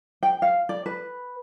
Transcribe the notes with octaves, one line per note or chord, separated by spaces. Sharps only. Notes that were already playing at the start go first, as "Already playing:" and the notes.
G5
F5
D5
B4